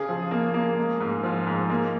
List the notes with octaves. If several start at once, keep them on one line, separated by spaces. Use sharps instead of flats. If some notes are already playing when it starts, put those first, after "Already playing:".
Already playing: C#3 G#4
F3
A#3
A#3
G#3
G#2
F3
G#2
A#3